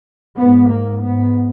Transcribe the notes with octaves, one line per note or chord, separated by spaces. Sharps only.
G#2 B3
A#3
G#2 B3